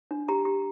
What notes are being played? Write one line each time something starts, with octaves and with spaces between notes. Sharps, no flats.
D4
G4 A#5
G4